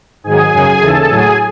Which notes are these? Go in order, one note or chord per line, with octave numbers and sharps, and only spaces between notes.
G#2 D#3 F#3 G#4 G#5
F#2 C#3 F#3
D#2 C#3 E3 A4 A5
A2 F#3 G#4 G#5